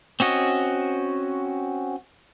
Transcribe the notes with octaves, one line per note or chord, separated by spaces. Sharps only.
C4 C#4 F#4 D#5